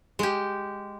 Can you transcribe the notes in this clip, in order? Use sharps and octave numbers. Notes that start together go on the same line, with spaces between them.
G#3 G4